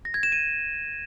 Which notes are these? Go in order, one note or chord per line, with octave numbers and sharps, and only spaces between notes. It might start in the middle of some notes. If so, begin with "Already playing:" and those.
A#6
G#6
E7
D#7